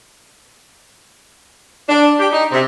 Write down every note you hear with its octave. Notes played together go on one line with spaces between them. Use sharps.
D4
G4
D#4
C3